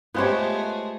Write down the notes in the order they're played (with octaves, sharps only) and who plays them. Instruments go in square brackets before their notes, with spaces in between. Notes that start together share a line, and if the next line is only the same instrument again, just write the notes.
[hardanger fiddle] G#3 A3 [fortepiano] B3 C5 C#5 [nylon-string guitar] F4 G4